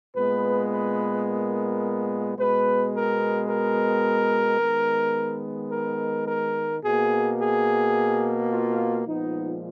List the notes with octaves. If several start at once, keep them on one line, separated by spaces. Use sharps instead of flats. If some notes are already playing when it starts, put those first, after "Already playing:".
A#2 G#3 B3 B4
B4
A#4
B2 G#3 B3 B4
A#4
A#4
D#3 G#3 B3
A#4
A#4
B2 A#3 G#4
G#4
F4
A#2 F3 G#3 B3 D#4